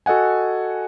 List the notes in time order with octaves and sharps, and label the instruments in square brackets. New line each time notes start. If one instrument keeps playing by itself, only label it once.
[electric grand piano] F#4 A4 D#5 F#5 G#5